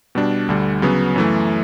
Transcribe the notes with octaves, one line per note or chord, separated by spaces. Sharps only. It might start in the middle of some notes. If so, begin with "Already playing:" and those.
B2 G3 D4
D2 D3 G3
C#3 F#3 B3
F#2 E3 A3